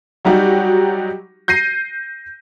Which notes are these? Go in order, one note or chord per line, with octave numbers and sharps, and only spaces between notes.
F#3 G3 D#4 F#4 G4
G6 A#6 C7 D#7